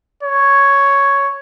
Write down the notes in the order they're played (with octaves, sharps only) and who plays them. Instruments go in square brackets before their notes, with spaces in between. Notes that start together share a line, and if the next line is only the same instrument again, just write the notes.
[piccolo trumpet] C#5